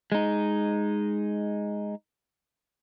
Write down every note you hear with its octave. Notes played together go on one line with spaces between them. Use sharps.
G#3 D#4